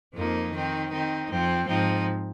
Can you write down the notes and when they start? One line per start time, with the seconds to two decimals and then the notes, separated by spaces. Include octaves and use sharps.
0.13 F2 F3 A#3 D#4
0.52 D#3 C4 D#4
0.90 D#3 C4 D#4
1.29 F2 F3 C4
1.66 G#2 F3 C4 D#4